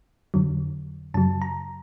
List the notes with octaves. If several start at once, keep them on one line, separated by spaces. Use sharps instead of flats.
F2 D3 F#3
F#2 C#3 F#3 A5
A#5